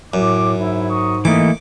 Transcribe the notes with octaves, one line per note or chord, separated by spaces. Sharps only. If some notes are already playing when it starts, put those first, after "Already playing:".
F#2 A2 D6
G#2 E4
A#5 C#6 D#6
E3 A3 A#3 D#4 D#5 D6